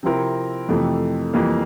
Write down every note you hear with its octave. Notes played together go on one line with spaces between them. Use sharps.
C3 F3 C4 E4 A#4
F2 C3 E3 A3
F2 E3 G3 A#3